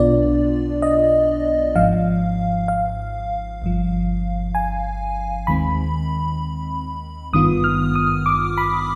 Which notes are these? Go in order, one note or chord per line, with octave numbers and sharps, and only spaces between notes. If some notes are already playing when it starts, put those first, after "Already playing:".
Already playing: B1 B2 B3 D4 F4 D5
D#5
G#1 G#2 F3 F5
F5
G1 G2 F3
G#5
D#2 D#3 G#3 C4 B5
G#1 G2 D#3 B3 F4 D#6
F6
D#6
D6
B5